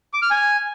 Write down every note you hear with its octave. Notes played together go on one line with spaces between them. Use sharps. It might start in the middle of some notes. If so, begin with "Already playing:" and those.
D6
F6
G#5